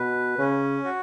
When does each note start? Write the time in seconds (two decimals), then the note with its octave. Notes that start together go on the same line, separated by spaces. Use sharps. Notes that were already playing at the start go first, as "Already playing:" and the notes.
Already playing: B2 B4
0.38 C#3 C#4
0.84 F#4